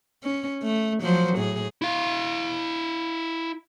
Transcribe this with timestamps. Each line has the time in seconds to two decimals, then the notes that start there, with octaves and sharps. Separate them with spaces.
0.24 C#4
0.63 A3
1.02 F3 F#3 C5
1.37 A2 G#4
1.82 E4 F5